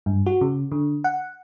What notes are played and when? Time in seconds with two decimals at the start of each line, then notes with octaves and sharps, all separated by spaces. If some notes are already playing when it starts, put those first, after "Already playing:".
0.06 G2
0.26 F#4
0.41 C#3
0.72 D3
1.04 F#5